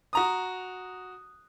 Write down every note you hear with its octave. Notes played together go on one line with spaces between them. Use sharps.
F#4 A#5 D#6